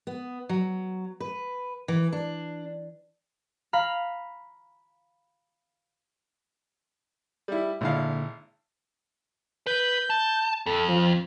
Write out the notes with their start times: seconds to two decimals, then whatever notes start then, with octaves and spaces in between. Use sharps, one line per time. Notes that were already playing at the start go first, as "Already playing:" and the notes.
0.07 B3
0.49 F#3
1.20 B4
1.88 E3
2.12 D4
3.73 F5 A#5 B5
7.48 G3 E4
7.81 G#1 A#2 D3 E4 F5
9.67 B4 G6
10.10 A5
10.66 F2 A4
10.89 F3